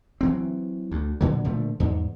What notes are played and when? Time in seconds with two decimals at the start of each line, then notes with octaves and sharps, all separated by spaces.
0.21 E3 F#3 C4
0.91 D2
1.21 A#2 D3 F#3
1.44 A#2 D3 F3 A3
1.80 E2 G#2